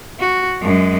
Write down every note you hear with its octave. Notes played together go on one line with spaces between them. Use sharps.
F#4
F#2 G#3